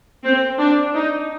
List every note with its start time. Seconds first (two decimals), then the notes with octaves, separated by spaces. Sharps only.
0.24 C4
0.59 D4
0.94 D#4